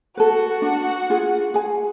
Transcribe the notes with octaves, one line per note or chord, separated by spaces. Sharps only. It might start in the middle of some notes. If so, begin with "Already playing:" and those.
F#4 A4 B4 F#5
D4
F4 G#4
G#4 G#5